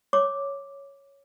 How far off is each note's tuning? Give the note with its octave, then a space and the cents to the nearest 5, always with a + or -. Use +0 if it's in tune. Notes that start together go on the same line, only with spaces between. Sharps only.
C#5 +0 D6 +0